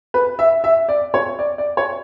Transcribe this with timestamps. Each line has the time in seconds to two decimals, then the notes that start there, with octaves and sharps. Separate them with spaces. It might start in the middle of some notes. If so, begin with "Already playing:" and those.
0.14 B4
0.39 E5
0.64 E5
0.89 D5
1.14 C#5
1.39 D5
1.58 D5
1.77 C#5